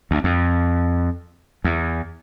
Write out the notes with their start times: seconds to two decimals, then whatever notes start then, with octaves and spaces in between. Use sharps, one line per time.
0.11 D2
0.24 F2
1.64 E2